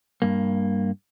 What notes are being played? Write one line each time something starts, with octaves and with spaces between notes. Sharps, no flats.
G2 A#3